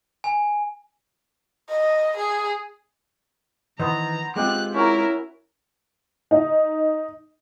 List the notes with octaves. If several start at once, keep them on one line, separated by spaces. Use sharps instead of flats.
G#5
D#5
G#4
D#3 E3 B3 C5 A#5
G#3 C4 F4 G4 F#6
C#4 E4 F#4 A#4 A#5
D#4